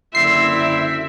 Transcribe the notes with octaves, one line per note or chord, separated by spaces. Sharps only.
F#1 D3 C4 E4 E5 C7